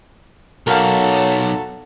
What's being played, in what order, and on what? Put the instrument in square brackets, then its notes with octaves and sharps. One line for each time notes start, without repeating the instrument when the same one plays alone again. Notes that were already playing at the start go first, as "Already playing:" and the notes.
[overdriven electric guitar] B1 [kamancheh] F#4 A4 [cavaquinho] A#4 F5